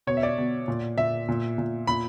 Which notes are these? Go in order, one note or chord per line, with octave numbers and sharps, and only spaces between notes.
B2 C#5
E5
D5
B2
A#2
A#2 E5
A#2
A#2
A#2 B5